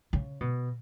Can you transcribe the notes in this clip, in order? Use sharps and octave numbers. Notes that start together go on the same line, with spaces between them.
C#3
B2